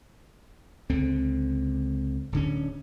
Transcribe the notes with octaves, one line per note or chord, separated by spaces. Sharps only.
C#2 D3 C4
D1 D3 C#4